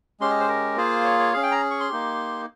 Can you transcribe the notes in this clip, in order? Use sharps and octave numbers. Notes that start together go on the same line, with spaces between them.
G#3 C#4 G4 C6
D#5
C5
A#4
A#3 F4 G#4 C5
C#5
C#5
C#4 G#4 F5
G5
A#5
C#6
C6
A#3 D#4 G4